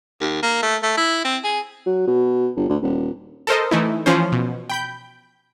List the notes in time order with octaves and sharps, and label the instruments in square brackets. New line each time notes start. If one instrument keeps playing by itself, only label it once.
[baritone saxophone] D#2
A#3
A3
A3
E4
C4
G#4
[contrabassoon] F#3
B2
G1
D2
D#1
[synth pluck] A4 A#4 C5 D#5
E3 A3 D#4 E4
E3 F3 C#4 C5
B2
G5 B5 G6